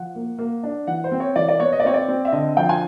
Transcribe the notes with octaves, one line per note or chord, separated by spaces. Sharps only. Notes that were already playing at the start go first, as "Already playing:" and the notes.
Already playing: F3 F#5
A#3
A#3
D4
E3 F#5
C5
C4
C#5
E3 D5
D5
B3 C#5
D#5
D5
C4 C#5
D5
C4
E5
D3 D#5
F3 G5
G#5